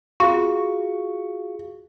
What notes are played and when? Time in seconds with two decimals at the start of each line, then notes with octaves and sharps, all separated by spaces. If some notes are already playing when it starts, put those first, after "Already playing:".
0.20 F4 F#4 G#4 F5 C#6